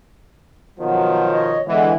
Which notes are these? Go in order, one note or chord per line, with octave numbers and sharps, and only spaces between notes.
B2 D#3 F3 F#3 B3
C#5 D#5
D3 E3 G#3 B3